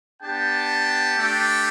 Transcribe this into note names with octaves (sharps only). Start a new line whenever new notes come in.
B3 D4 G4 G5 A5
A3 D4 G4